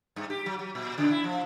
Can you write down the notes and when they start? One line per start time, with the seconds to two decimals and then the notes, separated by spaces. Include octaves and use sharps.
0.16 G2
0.30 G4
0.46 F#3
0.59 F#3
0.75 A#2
0.98 C#3
1.11 E4
1.24 F3